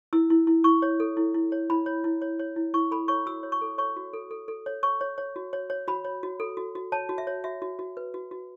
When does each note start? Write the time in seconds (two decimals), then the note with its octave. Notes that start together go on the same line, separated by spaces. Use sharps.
0.13 E4 E6
0.30 E4
0.47 E4
0.64 E4 C#6
0.82 C#5
1.00 A4
1.17 E4
1.34 E4
1.52 C#5
1.70 E4 B5
1.86 C#5
2.04 E4
2.22 C#5
2.39 C#5
2.56 E4
2.74 E4 C#6
2.91 A4 B5
3.08 C#5 C#6
3.26 F#4 E6
3.43 C#5
3.52 C#6
3.61 A4
3.78 C#5 C#6
3.96 F#4
4.13 A4
4.31 A4
4.48 A4
4.66 C#5
4.83 C#5 C#6
5.01 C#5
5.18 C#5
5.36 F#4
5.53 C#5
5.70 C#5
5.87 F#4 B5
6.05 C#5
6.23 F#4
6.40 A4
6.57 F#4
6.75 F#4
6.92 C#5 A5
7.09 F#4
7.18 E5
7.27 C#5
7.44 F#4 E5
7.62 F#4
7.79 F#4
7.97 B4
8.14 F#4
8.31 F#4